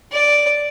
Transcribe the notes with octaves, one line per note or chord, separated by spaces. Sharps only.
D5